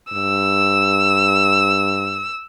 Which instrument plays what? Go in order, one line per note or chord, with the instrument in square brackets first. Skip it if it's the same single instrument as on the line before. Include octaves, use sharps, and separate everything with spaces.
[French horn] G2 [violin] E6